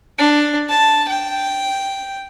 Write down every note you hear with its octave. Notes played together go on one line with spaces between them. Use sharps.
D4
A5
G5